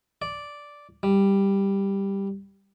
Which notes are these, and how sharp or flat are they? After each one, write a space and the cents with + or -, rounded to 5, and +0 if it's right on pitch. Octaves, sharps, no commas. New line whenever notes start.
D5 -5
G3 +5